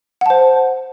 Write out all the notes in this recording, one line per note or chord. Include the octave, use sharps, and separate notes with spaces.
C5 F#5 A5